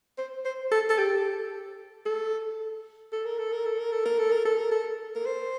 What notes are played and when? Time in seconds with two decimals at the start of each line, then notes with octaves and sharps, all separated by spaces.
0.18 C5
0.45 C5
0.71 A4
0.90 A4
0.98 G4
2.06 A4
3.12 A4
3.25 A#4
3.38 A4
3.52 A#4
3.65 A4
3.79 A#4
3.92 A4
4.05 A#4
4.18 A4
4.32 A#4
4.45 A4
4.58 A#4
4.71 A4
5.15 A#4
5.26 C5